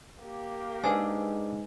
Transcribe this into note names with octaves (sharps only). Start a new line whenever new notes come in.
A#3 G4
G#2 D4 G#4 B4 C5 G#5